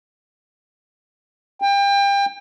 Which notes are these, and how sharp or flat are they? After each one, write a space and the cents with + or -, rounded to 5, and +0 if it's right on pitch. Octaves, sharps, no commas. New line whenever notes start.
G5 +30